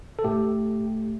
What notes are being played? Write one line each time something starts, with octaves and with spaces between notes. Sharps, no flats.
A4
A2 A3 G4